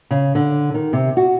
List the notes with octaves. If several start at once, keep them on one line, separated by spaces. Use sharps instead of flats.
C#3
D3
D#3
C3
F#4